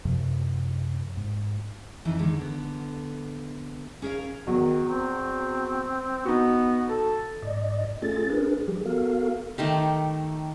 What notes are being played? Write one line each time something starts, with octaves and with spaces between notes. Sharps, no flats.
F#2 C3 F3
G#2
F2 E3 D#4
D3 D#3 G#3
D3 B3
C#4 G#4 A#4 C#5 F5
E2 D#3 F#3
C4
B3 D#4 F#4
A4
G#2 D5 D#5
A3 C#4 F4 G#4 A4 A6
C#4 D4 G#4 A#4 B4
F3 G3 G4 G#4
B3 F#4 A4 A#4 F5
D#3 A3 G4